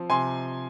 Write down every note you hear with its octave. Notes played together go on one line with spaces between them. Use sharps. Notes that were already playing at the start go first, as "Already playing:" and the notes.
Already playing: F3 C4
C3 G#5 C6